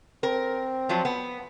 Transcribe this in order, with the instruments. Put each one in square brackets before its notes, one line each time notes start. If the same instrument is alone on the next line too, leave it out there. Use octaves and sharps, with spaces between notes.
[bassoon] C4 [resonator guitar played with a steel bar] A#4
[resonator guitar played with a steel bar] F3 F#3 F4
B3